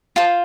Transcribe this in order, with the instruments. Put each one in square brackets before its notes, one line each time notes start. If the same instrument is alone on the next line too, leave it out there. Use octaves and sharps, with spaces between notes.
[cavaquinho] F4 C5 A5